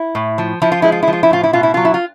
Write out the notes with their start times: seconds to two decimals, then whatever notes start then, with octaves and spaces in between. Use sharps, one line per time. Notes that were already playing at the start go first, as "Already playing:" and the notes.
Already playing: E4
0.15 A2
0.38 F3
0.62 F3 E4
0.72 F4
0.82 G#3 E4
0.92 F4
1.03 E4
1.08 F3
1.13 F4
1.23 E4
1.31 A2 F4
1.43 E4
1.53 B2 F4
1.63 E4
1.74 F#3 F4
1.85 E4
1.94 F4